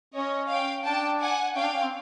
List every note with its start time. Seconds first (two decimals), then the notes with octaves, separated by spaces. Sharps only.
0.14 C#4 C#5 D#5
0.49 F5 G5
0.85 D4 G5 A5
1.20 F#5 G#5
1.55 C#4 F5 G5
1.64 D4
1.73 C#4
1.82 C4